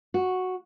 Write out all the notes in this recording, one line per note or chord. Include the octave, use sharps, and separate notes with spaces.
F#4